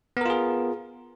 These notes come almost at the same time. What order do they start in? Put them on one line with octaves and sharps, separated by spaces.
B3 A#4 F4 G#4